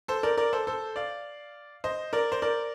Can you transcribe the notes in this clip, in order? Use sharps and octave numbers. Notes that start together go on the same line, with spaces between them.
A4 C5
A#4 D5
A#4 D5
A4 C5
A4 C5
D5 F5
C5 D#5
A#4 D5
C5
A#4 D5